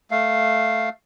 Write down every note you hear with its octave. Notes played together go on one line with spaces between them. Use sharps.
A3 F5